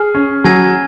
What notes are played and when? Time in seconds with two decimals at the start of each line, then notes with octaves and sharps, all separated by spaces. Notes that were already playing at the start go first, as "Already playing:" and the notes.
Already playing: G#4 F6
0.15 C#4
0.44 F#3 G#5 G#6